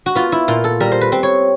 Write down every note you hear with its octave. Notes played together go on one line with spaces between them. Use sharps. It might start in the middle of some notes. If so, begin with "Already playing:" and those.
F#4
B3 F4
E4
A#2 F4
A4
G3 A#4
C5
B4
C4
C#5